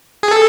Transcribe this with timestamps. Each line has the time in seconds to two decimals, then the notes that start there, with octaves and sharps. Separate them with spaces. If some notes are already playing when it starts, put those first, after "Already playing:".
0.23 G#4
0.31 A4